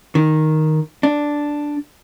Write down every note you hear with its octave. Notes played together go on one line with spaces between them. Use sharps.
D#3
D4